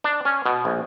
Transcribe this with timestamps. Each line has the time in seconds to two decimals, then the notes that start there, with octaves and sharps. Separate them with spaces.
0.04 D4
0.25 C#4
0.46 B2
0.65 A#1